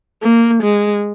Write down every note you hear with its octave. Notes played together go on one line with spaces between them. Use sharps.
A#3
G#3